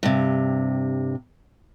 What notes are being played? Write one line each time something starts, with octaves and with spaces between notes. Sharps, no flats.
G2 C3